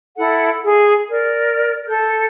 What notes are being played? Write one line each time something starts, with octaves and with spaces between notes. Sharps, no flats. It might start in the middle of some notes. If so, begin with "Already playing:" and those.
E4 A4 F#5
G#4
A#4 D5
A4 G6